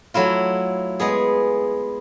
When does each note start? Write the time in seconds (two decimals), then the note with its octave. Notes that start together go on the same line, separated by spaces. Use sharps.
0.14 F#3 A3 E4 F4
1.00 G#3 B3 G#4